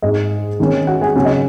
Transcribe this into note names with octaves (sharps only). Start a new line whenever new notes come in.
G#2 G#3 D#4 D#5
D#3 G#3 C#4
F#4 F#5
G#4 G#5
C#3 F#3 C#4 F#4 F#5
D#5